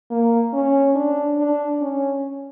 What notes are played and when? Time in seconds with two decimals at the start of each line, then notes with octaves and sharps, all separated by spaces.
0.11 A#3
0.53 C#4
0.96 D4
1.39 D4
1.82 C#4